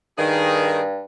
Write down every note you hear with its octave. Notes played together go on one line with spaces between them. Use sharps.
G2 D#3 G#4